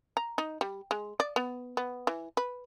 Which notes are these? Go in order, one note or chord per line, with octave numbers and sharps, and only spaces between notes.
A#5
D#4
G3
G#3
D5
B3
B3
E3
B4